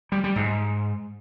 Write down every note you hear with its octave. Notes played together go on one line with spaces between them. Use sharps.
G3
G3
G#2